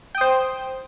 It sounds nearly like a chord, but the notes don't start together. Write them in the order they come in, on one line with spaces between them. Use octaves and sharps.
G5 D#6 C5